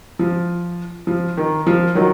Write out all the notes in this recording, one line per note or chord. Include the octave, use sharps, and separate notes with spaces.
F3
F3
D#3
F3
D#3 F#3